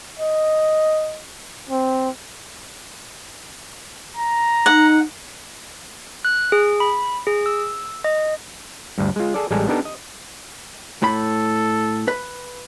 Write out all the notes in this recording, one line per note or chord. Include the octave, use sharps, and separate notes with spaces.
D#5
C4
A#5
D#4 F#5
F#6
G#4
B5
G#4
E6
D#5
D2 G2
G#3 F4
G#4 A4 D5
A1 G3 G#3 A4 G#5 A#5
B3 D4 D#4 G4 A4 A#4
D#5
A2 A4 B5
B4